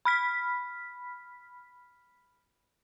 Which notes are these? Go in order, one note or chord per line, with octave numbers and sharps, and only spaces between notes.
B5 F6 B6